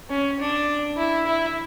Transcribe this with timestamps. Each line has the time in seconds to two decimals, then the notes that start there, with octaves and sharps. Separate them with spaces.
0.10 C#4
0.39 D4
0.97 E4
1.26 E4